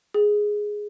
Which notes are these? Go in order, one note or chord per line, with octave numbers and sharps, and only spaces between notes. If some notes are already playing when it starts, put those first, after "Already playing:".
G#4